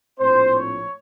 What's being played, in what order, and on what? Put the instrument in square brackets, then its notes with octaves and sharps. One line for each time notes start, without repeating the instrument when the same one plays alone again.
[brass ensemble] A#1 A2 F3 C4 C5
C#5